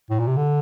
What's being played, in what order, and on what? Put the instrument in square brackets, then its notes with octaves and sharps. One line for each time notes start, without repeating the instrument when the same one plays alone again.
[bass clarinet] A2
A#2
C3
D3